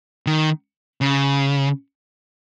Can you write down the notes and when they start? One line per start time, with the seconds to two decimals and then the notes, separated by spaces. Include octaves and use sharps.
0.27 D#3
1.01 C#3